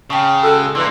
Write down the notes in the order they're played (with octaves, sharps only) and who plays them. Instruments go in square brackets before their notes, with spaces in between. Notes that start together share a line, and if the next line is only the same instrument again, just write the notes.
[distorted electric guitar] C#3 [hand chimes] G5 A5 C#6
[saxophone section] G#3 F#4 A4
[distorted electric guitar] D3 A#3 [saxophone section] E3 [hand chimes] C6